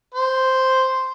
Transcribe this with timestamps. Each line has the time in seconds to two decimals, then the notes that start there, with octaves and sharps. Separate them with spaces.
0.15 C5